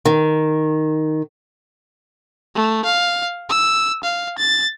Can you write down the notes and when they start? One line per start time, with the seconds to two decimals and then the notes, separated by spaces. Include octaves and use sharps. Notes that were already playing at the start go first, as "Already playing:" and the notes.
0.05 D#3
2.55 A3
2.85 F5
3.50 E6
4.04 F5
4.38 A6